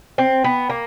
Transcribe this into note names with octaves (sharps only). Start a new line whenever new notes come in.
C4
B3
A#3